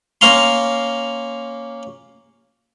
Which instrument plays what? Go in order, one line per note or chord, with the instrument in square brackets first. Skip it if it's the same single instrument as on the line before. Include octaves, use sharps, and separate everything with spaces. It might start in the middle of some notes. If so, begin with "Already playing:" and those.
[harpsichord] A#3 C#4 F5 A#5 C6